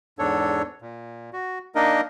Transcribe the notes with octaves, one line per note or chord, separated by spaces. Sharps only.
E2 G#2 D4 A4 C#5
A#2
F#4
A#3 D4 D#4 A#4 D#5